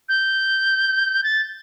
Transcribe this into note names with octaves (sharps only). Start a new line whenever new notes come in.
G6
A6